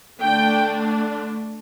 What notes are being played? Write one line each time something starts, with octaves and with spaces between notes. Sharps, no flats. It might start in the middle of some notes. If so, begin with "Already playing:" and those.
D3 A3 D4 G5